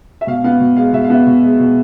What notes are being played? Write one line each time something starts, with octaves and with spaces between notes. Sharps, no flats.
E5
B2 F5
B3 F5
B2
G#3 F5
B2 E5
F5
B3 E5
B2
G#3
B2